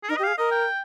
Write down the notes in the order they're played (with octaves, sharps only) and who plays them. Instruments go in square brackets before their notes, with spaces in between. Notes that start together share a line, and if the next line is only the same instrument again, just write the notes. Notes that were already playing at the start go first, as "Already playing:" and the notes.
[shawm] G#4
[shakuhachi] D#4 [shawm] A#4
[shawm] D#5
[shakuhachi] G4
[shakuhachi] G#4 [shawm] F5
[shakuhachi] A#4 [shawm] D#5
[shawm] G5